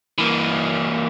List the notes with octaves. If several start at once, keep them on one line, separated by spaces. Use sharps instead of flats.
E3 A#3